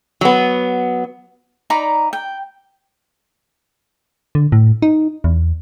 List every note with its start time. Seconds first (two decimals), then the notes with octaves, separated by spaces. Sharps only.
0.21 F#3 B3
1.70 D#4 D5 A#5 B5
2.13 G5
4.35 D3
4.52 A2
4.82 D#4
5.24 E2